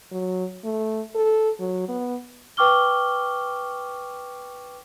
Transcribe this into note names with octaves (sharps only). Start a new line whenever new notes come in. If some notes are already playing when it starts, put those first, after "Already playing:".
F#3
A3
A4
F#3
B3
B4 G5 C#6 D6 F6 G7